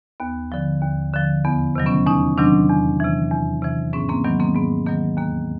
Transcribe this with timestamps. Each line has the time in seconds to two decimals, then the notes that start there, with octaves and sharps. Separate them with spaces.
0.20 D#2 B3
0.52 D3 F3
0.82 D#2
1.13 D3 F3
1.45 E2 B3
1.75 C3 D#3 F#3
1.86 B3 C#4
2.06 E2 C#4 D#4
2.38 C3 D#3 F#3 C4 D4
2.69 E2
3.00 C3 E3
3.31 E2
3.62 C3 E3
3.93 G#2 B3 C#4
4.09 A#3 C4
4.25 D#3 F#3 B3
4.40 A#3 C4
4.55 G#2 B3
4.86 D#3 F#3 A#3
5.17 D#2 A#3